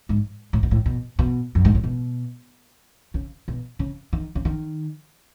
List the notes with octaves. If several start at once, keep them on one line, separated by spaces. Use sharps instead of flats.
G#2
A2
B2
A2
B2
B2
F#2
G#2
A2
B2
C#3
B2
C#3
D#3
C#3
D#3